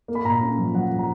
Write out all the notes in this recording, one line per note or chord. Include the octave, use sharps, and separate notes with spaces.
A#3
B5
A#2 A#5
C#4
F3
F3 F#5
F3
A#5